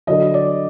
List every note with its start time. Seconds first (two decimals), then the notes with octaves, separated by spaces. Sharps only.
0.07 D3 F#3 D#5
0.34 D5